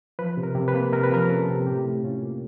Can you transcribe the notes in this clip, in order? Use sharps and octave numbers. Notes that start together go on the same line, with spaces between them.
F3 B4
C3
A#4
C3
B4
A#3
C3 A#4
B4
F3 A#4
C#4 A4
C3
A2 G4
A2
C#4 F4
A#3